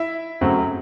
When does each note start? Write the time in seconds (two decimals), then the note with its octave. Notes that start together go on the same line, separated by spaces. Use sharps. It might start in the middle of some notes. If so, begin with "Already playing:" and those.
Already playing: E4 E5
0.41 F#2 C#3 F#3 A3 C4